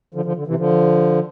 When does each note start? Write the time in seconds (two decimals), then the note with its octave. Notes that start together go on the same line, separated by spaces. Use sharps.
0.14 D3 F3
0.25 D3 F3
0.36 D3
0.47 C3 E3
0.58 D3 F3